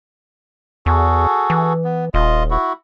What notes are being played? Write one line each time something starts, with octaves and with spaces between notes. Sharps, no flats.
E2 F#4 G#4 A4
E3
B3
D#1 F4 D#5
E4 F#4